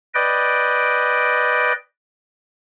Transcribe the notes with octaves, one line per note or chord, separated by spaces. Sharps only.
B4 D5 D#5 G5